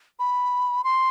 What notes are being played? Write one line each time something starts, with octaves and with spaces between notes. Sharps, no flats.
B5
C6